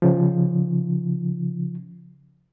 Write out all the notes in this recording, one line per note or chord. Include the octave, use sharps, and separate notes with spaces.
C#3 F3